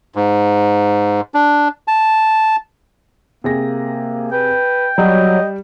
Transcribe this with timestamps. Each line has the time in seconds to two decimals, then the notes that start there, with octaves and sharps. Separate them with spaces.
0.15 G#2
1.34 D4
1.88 A5
3.44 C3 A#3 G#4 A#6
4.32 B4 G5
4.98 F#3 G3 D#5